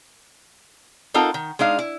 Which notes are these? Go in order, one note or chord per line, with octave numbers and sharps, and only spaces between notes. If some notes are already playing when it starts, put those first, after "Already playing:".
C4 D#4 F4 A4 A#4 F#5
D#3
G#3 D4 D#4 F5
E4